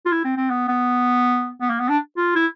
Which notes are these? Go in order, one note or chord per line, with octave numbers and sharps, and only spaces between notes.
F4
E4
C4
C4
B3
B3
B3
A#3
B3
D4
F4
E4